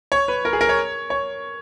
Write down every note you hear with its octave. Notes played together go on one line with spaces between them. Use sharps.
C#5
B4
A#4
G#4
A#4
C#5
C#5